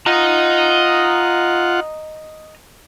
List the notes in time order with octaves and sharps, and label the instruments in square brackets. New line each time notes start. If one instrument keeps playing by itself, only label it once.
[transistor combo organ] F4 F#5 [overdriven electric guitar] D#5 A#5